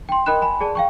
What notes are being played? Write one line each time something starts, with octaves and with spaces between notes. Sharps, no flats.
G5 C6
A#4 D#5 G5 B5 F#6 E7
G#5 B5
G#4 D5 A5
F5 G5 C#6